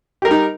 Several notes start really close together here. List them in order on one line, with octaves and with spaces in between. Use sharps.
G4 A#4 G3 D#4